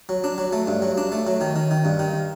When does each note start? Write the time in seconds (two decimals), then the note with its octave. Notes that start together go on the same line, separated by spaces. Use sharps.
0.09 F#3
0.24 D4
0.38 F#3
0.53 A3
0.67 G2
0.82 F#3
0.98 D4
1.12 A3
1.27 F#3
1.41 D#3
1.56 D#3
1.71 D#3
1.85 G2
1.99 D#3